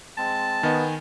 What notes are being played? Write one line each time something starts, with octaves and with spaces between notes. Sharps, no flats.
G#3 C4 A5
D#3 B3 D#5 G#5